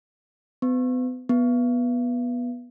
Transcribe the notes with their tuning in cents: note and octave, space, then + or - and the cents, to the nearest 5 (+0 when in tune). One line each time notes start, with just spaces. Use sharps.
B3 +40
B3 -15